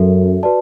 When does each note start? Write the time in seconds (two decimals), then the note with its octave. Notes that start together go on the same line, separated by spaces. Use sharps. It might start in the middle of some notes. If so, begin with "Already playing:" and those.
Already playing: F#2 F#4 A4 E5
0.43 F#4 B4 D5 A5